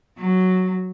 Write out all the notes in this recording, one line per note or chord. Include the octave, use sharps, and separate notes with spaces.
F#3